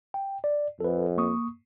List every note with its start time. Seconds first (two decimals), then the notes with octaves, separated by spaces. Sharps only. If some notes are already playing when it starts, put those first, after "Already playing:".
0.14 G5
0.44 D5
0.80 F2 A4 B4
1.17 A#3 C#6 D#6